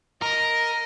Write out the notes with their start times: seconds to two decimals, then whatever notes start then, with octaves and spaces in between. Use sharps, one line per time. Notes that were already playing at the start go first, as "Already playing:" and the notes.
0.22 A#4 D#5